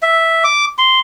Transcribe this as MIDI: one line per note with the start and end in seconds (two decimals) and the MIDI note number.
0.03 0.43 76
0.44 0.65 86
0.78 1.00 84